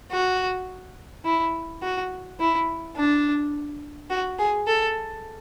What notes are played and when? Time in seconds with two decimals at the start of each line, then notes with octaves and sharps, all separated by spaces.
0.12 F#4
1.25 E4
1.82 F#4
2.40 E4
2.96 D4
4.10 F#4
4.39 G#4
4.67 A4